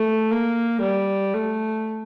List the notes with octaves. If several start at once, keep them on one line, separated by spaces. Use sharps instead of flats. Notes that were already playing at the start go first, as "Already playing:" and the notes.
Already playing: A3
A#3
G3
A3